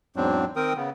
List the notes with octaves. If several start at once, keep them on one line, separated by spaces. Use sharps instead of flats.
E2 G#2 F#3 C4 D4
D#3 C4 A#4 G5 D#6
C#3 B3